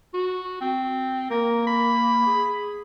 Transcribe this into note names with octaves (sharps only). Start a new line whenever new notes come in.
F#4
C4
A#3 A#4
B5
G#4